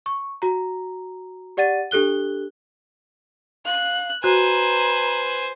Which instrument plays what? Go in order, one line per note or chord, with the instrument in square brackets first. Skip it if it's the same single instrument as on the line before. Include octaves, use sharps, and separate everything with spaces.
[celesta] C#6
F#4 A#5
G4 D5 F#5 A6 D#7
D4 G4 A4 F#6 G7
[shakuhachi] F5 [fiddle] F#6
[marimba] F#4 [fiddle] B4 [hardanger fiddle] C5 G#5 [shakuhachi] A#5